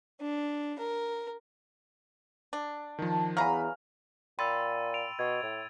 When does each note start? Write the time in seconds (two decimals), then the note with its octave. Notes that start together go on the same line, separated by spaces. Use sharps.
0.21 D4
0.79 A#4
2.53 D4
2.99 D#3 F3 A5
3.37 E2 F#3 F5 G#5 A#5 B5 F6
4.39 A#2 G5 B5 C6 E6 A6 D#7
4.94 D7 F7
5.19 B2 G#6
5.43 A2